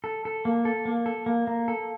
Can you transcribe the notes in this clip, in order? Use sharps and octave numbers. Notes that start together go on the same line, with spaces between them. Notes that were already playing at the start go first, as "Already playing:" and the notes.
A4
A4
A#3
A4
A#3
A4
A#3
A#3
A4